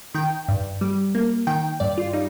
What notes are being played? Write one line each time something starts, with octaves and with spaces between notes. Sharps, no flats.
D#3 G5
G2
G3
A#3
D#3 G5
G2 D5
F4
G3 D#4